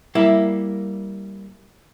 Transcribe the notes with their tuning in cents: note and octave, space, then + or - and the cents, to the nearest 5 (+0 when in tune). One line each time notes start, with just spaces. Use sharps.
G3 +0 A#3 +0 E4 +0